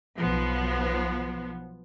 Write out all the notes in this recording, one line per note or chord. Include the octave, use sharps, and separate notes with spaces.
B1 F3 B3